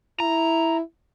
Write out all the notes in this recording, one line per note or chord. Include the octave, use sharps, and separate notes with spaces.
E4 A#5